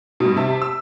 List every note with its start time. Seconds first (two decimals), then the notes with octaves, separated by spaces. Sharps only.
0.20 G2 B2
0.36 C3 E5 A5
0.62 E6